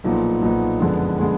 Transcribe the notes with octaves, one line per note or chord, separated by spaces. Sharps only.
B1 A#2 F3 B3 D#4
B1 A#2 F3 B3 D#4
F#1 F2 D3 G#3 B3
D3 G#3 B3